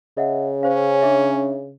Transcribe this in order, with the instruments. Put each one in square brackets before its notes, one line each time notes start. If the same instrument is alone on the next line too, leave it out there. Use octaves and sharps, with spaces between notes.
[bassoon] C#3 [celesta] D#5 E5 F#5
[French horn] C#4 [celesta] C5 F5
[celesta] D4 G#4 E5